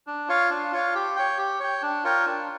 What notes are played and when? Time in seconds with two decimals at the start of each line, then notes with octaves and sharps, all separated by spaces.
0.07 D4
0.28 F4 C#5 F5
0.50 D4
0.72 F4 C#5 F5
0.95 G4
1.16 C#5 G5
1.38 G4
1.60 C#5 G5
1.82 D4
2.04 F4 A#4 C#5 G5
2.26 D4